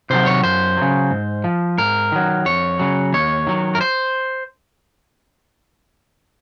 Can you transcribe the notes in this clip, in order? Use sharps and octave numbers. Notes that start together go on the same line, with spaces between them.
C3 D#3 F#3 C5
C#5
F#2 C5
C#3 F#3
G#2
F3
G#2 A#4
D#3 F#3
F2 C#5
C#3 F#3
D#2 C#5
D#3 F#3
A#4
C5